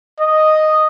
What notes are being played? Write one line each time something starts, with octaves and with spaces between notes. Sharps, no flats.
D#5